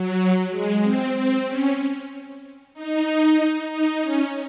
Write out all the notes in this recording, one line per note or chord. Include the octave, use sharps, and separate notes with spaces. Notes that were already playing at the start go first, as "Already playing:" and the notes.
Already playing: F#3
G#3
C4
C4
C#4
D#4
D#4
C#4